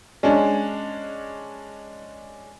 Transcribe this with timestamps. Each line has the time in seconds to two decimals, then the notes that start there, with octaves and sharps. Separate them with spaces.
0.23 G#3 C#4 D4